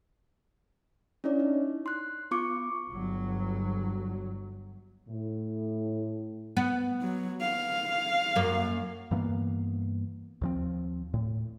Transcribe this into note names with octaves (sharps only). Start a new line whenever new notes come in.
C#4 D4 E4 C#5 D5
D#4
C6 F#6
B3 F4 C#6 D6 C#7
G1 F#3
A2
B3
F#3
F5
F#2 A#3
G2 E3 A#3 B3
D#2 F3 C4
A2